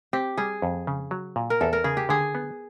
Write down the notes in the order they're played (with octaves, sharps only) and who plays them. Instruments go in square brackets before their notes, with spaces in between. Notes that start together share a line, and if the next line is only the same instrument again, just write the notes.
[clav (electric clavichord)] C4 [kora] G4
[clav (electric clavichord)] G3 [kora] G#4
[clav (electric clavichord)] F2
C#3
F#3
A#2
[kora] A#4
[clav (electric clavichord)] E2 [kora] A4
[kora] A#4
[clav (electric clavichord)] C#3 [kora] G#4
[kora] G4
[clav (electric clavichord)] D3 [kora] G#4
[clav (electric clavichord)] B3